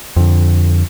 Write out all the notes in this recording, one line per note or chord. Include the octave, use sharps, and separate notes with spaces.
F2 D3